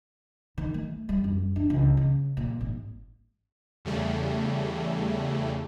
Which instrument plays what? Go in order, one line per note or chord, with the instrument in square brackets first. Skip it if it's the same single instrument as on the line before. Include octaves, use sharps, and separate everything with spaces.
[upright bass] D#3
A3
G3
F#2
D4
C#2
C#3
A#2
G#1
[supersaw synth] E2 C#3 G3 A3